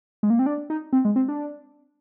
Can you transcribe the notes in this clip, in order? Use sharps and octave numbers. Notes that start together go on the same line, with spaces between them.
G#3
A#3
C4
D4
D#4
C4
G#3
C4
D4